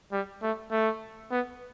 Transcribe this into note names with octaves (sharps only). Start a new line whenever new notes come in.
G3
A3
A3
B3